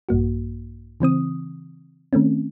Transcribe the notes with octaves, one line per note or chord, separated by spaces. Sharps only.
A#1 G2 A#3 F#4
C#3 E3 C4 D#6
D#3 A3 C4 C#4